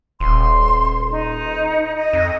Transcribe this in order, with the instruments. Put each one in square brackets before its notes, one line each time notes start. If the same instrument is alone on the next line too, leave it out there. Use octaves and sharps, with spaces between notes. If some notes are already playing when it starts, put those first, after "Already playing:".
[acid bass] D#1 [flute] C6
[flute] D#4
D#5
[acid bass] F2